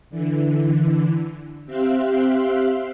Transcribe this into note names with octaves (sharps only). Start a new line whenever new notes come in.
D3 E3
C4 G4 E5 F5 C6 F#6